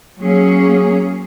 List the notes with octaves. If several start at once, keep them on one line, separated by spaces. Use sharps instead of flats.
F#3 A#3 C#4 G#4